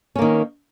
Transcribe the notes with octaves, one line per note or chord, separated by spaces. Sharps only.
D#3 A#3 C#4